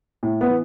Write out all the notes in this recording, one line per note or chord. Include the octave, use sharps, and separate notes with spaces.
A2
B3
E3